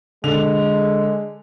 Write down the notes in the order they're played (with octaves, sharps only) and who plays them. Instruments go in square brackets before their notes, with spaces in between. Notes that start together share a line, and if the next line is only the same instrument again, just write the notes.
[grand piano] D3 F7 [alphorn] G#3